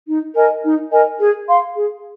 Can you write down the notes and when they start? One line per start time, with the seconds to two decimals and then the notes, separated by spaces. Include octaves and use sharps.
0.08 D#4
0.36 A#4 D#5 G#5
0.64 D#4
0.91 A#4 D#5 G#5
1.20 G#4
1.47 F5 C6
1.76 G#4